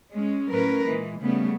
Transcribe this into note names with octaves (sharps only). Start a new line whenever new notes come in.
G#3 C#4
A2 F#3 C#4 A#4 B4
A#2 E3 G#3
C#3 G3 A3 B3